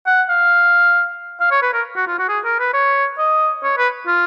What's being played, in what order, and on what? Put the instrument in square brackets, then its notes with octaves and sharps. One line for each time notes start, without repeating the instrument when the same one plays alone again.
[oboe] F#5
F5
F5
C#5
B4
A#4
F#4
F4
F#4
G#4
A#4
B4
C#5
D#5
C#5
B4
F4